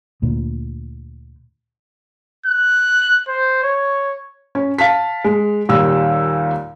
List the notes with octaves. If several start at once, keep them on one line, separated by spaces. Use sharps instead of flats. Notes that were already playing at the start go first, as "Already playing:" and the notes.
D2 A#2
F#6
C5
C#5
C#4
F5 A5 B6
G#3
D#2 A#2 G3 E6